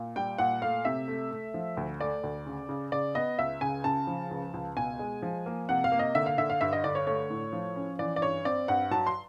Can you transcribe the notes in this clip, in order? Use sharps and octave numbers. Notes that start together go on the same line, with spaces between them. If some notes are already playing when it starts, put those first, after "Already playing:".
Already playing: A#2
G3 G5
A#2 F#5
A3 F5
C3 E5
A3
A3
F3
D2
A3 D5
D2
C#3
C#3
C#3 D5
B3 D#5
C#2 E5
C#3 G#5
C#3 A5
F3
C#2
C#2
B2 G#5
G#3
F3
A#3
C3 F#5
F5
A#3
D#5
D3 E5
F5
D3 E5
F5
G2 E5
D#5
D3 D5
C#5
A3 C#5
A2
F3
C#4
E3 D5
D5
G2 C#5
C4 D5
G2 F#5
F#3 A5
C6